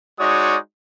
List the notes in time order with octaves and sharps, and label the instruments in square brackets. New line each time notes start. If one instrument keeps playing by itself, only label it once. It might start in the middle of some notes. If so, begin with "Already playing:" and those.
[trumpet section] G#3 D#4 F#4 C#5 D5 D#6